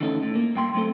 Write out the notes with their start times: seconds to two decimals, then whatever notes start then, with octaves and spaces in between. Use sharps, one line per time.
0.01 D3 E3 A3 C#4 D#4 A4
0.23 A2
0.35 A#3
0.55 G2 G5 C6
0.74 F#3 A3 C4 A4